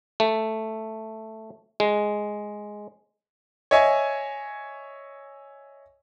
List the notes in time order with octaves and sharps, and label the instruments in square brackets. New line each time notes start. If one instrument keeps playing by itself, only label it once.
[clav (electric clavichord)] A3
G#3
[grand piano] C#5 D#5 E5 G#5